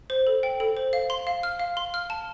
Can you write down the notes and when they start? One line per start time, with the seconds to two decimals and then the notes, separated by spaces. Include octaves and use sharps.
0.10 C5
0.27 A4
0.43 G5
0.60 A4
0.77 C5
0.93 F5
1.10 C6
1.27 F5
1.43 F6
1.60 F5
1.77 C6
1.94 F6
2.10 A5